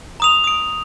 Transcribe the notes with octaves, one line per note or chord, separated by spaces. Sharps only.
A#5 D#6 F7
D#6 D7